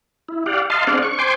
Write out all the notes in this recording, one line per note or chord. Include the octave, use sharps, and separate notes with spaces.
E4
G4 D5 F5 F#5
D#5 F5 A5 C6
C4 D4 G#4 D5 F5 F#5
C#6
C5 G5 G#5 C6 D6